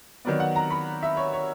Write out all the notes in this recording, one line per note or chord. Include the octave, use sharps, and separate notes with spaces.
D#3 F#3 B3 D5
F#5
A#5
B5
E5
C#5
C#5